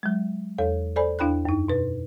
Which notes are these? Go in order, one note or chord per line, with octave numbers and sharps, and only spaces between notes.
F#3 G#3
E2 A4 C#5
A4 C5 D5 G#5 B5
E2 D4 E4 G5 B5 F#6
F#2 D#4
B2 B4